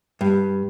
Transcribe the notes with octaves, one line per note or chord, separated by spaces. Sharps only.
G2